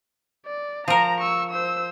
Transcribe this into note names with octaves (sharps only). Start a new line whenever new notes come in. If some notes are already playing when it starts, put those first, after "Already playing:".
D5
F3 A#4 A#5
C#6 E6
C5 E6